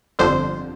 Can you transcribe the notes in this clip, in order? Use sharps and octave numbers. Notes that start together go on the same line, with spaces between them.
G1 F2 D3 C5